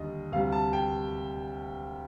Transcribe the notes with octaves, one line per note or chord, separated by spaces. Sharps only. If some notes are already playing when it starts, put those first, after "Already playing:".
Already playing: D#2 D3 G3 D#5
D2 C3 G3 F5
A5
G5